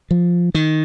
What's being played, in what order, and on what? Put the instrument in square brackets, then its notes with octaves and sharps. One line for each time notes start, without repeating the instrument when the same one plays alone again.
[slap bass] F3
D#3